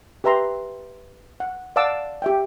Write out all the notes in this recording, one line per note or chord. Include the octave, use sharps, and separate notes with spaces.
G4 B4 E5 A#5 C6
F#5
D5 F5 F#5 A5 D6 E6
G4 E5 G5